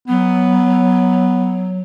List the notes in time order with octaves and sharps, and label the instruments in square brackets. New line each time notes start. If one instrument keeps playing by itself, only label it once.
[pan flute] F#3 [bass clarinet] B3